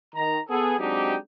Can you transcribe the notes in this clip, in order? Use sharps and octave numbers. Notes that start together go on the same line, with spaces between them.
D#3 A#5
B3 G#4 A4
F#3 G#3 C4 D4 D#4 G4